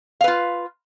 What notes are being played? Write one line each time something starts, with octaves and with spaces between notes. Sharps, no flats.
F4 B4 F5